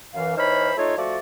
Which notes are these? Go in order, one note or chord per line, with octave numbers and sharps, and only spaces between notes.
F#2 E3 F5
E3 D#4 C5 C#5 B5 F6
A3 D#4 F4 C#5
F3 A3 F#4 D5